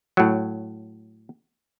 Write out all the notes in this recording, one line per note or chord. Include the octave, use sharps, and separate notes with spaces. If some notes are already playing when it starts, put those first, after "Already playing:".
A2 F#3